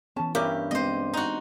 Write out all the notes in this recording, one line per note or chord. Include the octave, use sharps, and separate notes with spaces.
E3 B3 C#4 A5
G2 C#4 E4 G4 A#4
G#3 B3 C4 C5 D#5
D#4 F#4